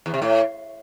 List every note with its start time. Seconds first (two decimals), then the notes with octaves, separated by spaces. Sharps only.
0.06 E2
0.14 C3
0.22 A2